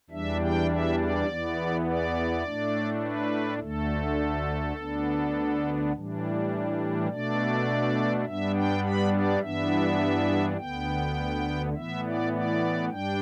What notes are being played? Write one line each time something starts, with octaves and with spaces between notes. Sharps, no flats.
E2 E3 G3 D4 E5
G5
E5
D5
E2 E3 B3
D5
A2 A3 D4
B4
D2 D3 A3 A4
D2 D3 B3 D4
A2 E3 G3 D4
B2 A3 D4 D5
G2 G3 B3 D4 E5
G5
B5
D5
G2 E3 B3 D4 E5
D2 D3 B3 G5
A2 E3 B3 E5
D5
D5
G2 G3 D4 G5